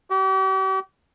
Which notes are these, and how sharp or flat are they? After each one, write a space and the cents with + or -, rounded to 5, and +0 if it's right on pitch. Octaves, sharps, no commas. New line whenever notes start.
G4 -40